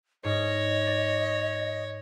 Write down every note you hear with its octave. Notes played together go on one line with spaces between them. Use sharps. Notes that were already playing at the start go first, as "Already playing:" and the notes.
G#2 C#5 D#5
D5